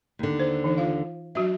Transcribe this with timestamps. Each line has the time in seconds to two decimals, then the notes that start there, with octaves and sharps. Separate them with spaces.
0.19 D#2 D3
0.40 C5
0.64 E3 D#4
0.78 F4 F5
1.35 F#3 D4 F#4 E5